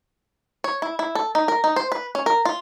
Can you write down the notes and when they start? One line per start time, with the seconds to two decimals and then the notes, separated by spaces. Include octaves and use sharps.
0.64 C#5
0.82 E4
0.99 E4
1.15 A4
1.35 D#4
1.48 A#4
1.64 D#4
1.76 C5
1.92 B4
2.15 C#4
2.26 A#4
2.45 F4